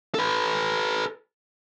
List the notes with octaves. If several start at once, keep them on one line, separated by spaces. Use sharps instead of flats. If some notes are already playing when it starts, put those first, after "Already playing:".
A4 B4